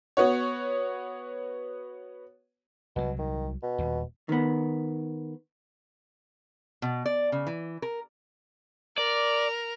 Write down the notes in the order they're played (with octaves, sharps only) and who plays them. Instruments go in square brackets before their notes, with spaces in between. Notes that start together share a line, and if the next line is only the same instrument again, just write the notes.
[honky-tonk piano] B3 F#4 C#5
[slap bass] C2 F#3 [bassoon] B2
[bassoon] D#3
B2
[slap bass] D#1 D#2
[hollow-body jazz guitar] D#3 B3
[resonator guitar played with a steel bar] B2
D5
C#3
E3
A#4
[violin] A#4 [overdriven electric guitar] D5